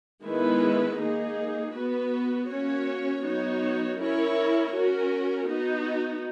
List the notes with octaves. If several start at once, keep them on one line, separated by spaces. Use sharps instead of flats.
D#3 G#3 B3 E4 B4
A#3 D#4 G#4
B3 F#4 B4
A#3 C#4 F#4 C#5
F#3 B3 D#4 F#4 C#5
C#4 E4 A#4 C#5
C#4 F#4 A#4
B3 D#4 F#4